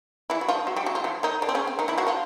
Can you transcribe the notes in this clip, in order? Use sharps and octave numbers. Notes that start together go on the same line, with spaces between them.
E3 E4
F#4
F3 F4
F#3 F#4
G3 G4
F#3 F#4
F3 F4
E3 E4
D#3 D#4
D3 D4
C4
C#3 C#4
C4
D#3 D#4
E3 E4
F#3 F#4
F3 F4